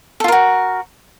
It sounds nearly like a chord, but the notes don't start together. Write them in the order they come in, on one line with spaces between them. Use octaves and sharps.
A4 F4 A#4 F#4